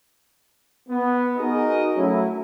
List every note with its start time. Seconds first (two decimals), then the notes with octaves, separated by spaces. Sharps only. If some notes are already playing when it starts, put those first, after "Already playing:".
0.89 B3
1.37 D#4 F#4 G#4 A#4 D#5
1.96 F#3 A3 C#4 E4